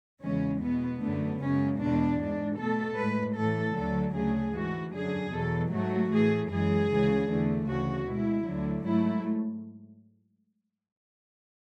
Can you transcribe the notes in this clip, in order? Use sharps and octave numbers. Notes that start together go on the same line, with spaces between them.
E2 C#3 E3 G#3 C#4
B2 G#3 B3
F#2 D3 A3 B3
F#2 C#3 G#3 C#4
E2 B2 G#3 D4
G#2 G#3 D4
B2 A3 A4
A2 G#3 B4
A2 E3 A3 A4
D2 D3 F#3 A3 A4
D2 C#3 F#3 A3 G#4
G#2 E3 A3 F#4
F#2 D3 F#3 G#4
E2 B2 F#3 A4
G#2 F#3 A3 F#4
A2 E3 A3 G#4
F#2 E3 G#3 G#4
D2 C#3 E3 G#3
E2 D3 A3
D2 C#3 E3 F#4
B2 G#3 E4
D2 D3 F#3
G#2 F#3 A3 E4